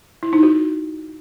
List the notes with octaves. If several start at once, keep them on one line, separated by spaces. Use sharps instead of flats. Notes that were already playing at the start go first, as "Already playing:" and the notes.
E4
D#4
F#4